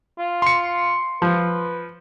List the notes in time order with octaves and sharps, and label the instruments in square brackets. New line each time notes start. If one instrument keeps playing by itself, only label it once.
[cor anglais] F4
[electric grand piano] C6 C#7
[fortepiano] F3 [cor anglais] B4